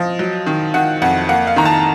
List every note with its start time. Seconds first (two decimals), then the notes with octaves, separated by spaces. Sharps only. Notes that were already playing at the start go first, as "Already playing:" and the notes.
Already playing: F3 D#5
0.19 F#3
0.47 D#3
0.74 D#3 F#5
1.02 F2 F#5
1.29 A#3 F#5
1.47 F5
1.56 D#3 A#5
1.65 A5